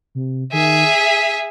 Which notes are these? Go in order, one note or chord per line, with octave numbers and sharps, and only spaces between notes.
C3
D#3 G#4 E5
B6